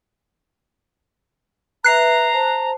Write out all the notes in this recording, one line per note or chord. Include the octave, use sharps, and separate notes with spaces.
B4 E5 A#5 F#6 C7
C5 A5